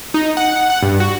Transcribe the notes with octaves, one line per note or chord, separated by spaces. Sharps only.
D#4
F#5
F#5
G2
F#4